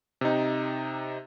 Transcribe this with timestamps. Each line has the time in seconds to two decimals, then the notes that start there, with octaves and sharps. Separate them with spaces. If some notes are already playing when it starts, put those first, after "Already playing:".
0.21 C3 D#4